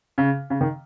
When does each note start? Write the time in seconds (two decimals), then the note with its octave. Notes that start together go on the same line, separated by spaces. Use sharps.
0.18 C#3
0.50 C#3
0.61 D#3